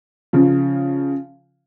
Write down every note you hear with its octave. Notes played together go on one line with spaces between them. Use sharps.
C#3 F3